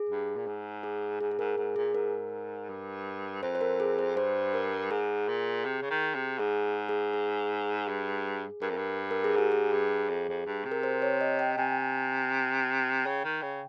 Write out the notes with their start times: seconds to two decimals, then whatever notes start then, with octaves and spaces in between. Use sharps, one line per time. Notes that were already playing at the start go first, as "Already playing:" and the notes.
Already playing: G#4
0.09 G2
0.36 A#2
0.47 G#2
0.83 G#4
1.21 G#2 G#4
1.31 G#4
1.39 G#2 A#4
1.57 G#2 G#4
1.76 A#2 G#4
1.94 G#2 A#4
2.69 G2
3.42 F2 C5
3.55 C5
3.61 A#4
3.80 G#4
3.99 C5
4.16 G2 C5
4.54 A#4
4.91 G#2 G#4
5.29 A#2
5.65 C3
5.82 C#3
5.90 D#3
6.14 C3
6.39 G#2 G#4
6.89 G#4
7.14 G#4
7.88 G2
8.62 G2 A#4
8.70 F2
8.77 G2
9.11 A#4
9.24 G#4
9.36 G#2 G4
9.52 G#4
9.73 G2
10.09 F2
10.29 F2
10.46 G2
10.65 C3
10.72 A#4
10.83 C5
11.02 C#5
11.21 D#5
11.39 G5
11.58 C3 G#5
13.06 C#3 G5
13.24 D#3
13.42 C#3